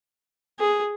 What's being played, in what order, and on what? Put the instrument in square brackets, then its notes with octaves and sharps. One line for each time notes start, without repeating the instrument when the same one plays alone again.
[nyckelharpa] G#4